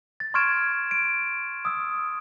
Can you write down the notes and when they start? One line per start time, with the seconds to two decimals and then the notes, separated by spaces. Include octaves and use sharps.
0.20 A6
0.34 C6 C#6 F6 G#6 D7 E7
0.91 D7
1.65 D#6 E6